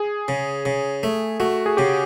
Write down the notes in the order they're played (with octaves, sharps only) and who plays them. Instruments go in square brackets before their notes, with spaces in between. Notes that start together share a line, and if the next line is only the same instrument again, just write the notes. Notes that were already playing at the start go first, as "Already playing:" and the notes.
Already playing: [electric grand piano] G#4
[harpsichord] C#3
C#3
A3
[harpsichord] A3 [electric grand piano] F#4
[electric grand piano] G#4
[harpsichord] C#3 [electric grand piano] G4